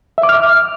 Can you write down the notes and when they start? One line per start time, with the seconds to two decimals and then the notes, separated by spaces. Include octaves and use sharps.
0.18 E5
0.23 D6
0.29 F6